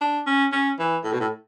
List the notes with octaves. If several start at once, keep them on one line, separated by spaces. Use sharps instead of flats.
D4
C#4
C#4
E3
A2
B2
A2